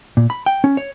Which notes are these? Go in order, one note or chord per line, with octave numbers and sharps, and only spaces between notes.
A#2
B5
G5
C#4
C#5